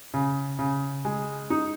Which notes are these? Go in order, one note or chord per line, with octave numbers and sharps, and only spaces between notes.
C#3
C#3
G#3
D#4